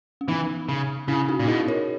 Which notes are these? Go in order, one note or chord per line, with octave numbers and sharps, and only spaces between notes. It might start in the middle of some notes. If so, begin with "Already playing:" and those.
C#4
E3 B3 D#4
C#3
C#3 C#4 E4
D#4 F#4
A#2
B2 E4 G#4
A#4 C#5